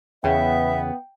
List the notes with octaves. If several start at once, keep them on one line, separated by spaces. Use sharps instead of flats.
E2 C#3 B3 E5 G5